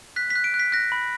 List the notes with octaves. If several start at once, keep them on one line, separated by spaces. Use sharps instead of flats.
F#6 B6
B6
F#6
D7
F#6
B6
F#6 A#6
B5